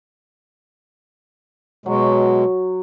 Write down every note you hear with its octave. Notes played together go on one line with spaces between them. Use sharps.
B2 F#3 G#3